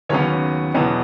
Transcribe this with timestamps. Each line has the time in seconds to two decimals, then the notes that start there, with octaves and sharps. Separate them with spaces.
0.09 D#2 C#3 F#3 B3 C#4 C#5
0.74 E2 B2 F#3 B3